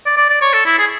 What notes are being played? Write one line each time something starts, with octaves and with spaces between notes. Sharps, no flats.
D5
D5
D5
C#5
A4
E4
G#4